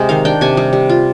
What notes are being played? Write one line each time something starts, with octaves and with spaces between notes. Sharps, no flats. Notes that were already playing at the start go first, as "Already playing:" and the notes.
Already playing: C3 G#3
D#3 F5
D4 G5
C3 G#5
G3
G3
F4